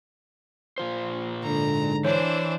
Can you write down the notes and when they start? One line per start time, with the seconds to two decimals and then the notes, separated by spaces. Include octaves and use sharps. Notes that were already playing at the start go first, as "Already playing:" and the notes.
0.78 A#2 F4 C5
1.43 G#2 D3 A#5
2.05 E3 D4 C5 C#5